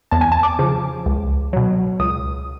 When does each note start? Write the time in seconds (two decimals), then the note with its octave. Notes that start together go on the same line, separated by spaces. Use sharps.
0.11 E2 A5
0.21 G#5
0.32 A5
0.43 D6
0.59 C#3 F3
1.06 C#2
1.53 B2 F#3
2.00 C#2 D#6